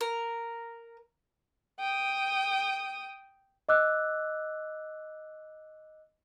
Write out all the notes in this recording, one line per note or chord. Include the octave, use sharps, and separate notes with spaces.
A#4
G5 D#6
D#5 D6 E6 F#6